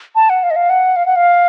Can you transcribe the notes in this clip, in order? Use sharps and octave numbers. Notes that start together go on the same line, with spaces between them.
A5
F#5
F5
D#5
F5
F#5
F5
F#5
F5